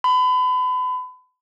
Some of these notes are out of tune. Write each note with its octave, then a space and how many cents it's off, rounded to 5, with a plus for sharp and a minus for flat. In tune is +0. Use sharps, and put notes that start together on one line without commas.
B5 +35